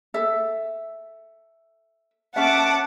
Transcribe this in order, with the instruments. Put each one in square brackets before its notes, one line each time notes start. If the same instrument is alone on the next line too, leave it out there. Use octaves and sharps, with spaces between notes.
[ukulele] A4 E5
[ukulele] C#4 E5 [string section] F#5 A5 D6